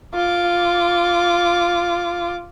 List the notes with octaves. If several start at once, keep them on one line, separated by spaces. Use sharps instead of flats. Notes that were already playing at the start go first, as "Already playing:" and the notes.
F4 D6